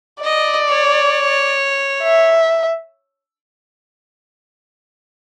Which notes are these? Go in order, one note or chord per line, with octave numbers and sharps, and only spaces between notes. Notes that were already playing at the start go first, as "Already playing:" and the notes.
D5 D#5
C#5
E5